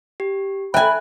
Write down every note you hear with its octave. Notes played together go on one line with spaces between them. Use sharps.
G4
C5 E5 G5 G#5 A#5 B5 F#6